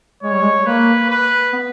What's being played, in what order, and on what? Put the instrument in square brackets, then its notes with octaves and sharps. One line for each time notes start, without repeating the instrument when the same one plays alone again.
[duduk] G#3 [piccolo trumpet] C#5
[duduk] G3
G#3
[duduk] A#3 [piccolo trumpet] B4
[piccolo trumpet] B4
[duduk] B3